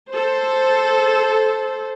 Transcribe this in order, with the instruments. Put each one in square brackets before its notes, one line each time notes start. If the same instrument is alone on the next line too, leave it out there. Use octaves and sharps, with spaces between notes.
[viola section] A4 C5